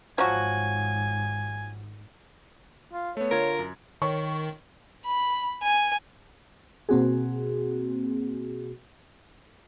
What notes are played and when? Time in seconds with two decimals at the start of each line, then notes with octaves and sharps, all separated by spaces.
0.18 G#1 G#2 F3 F#3 F#4 G#5
2.93 F4
3.17 A3 B3 C#5
3.31 D3 F4 A#4 G#6
3.59 F#2
4.02 D#3 C#5 C#6
5.05 B5
5.63 G#5
6.89 B2 A#3 C4 F#4 G#4